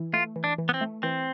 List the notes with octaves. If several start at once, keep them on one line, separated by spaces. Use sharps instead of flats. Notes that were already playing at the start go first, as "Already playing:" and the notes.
Already playing: E3 E4
A3 F4
E3
D4
E3
B3
C4
A3
E3 C4